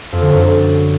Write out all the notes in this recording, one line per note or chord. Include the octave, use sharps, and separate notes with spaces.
F2
D3
F#2